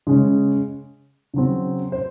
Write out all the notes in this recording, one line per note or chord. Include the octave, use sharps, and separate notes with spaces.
C#3 G#3 C#4
C#3 F#3 C4
C5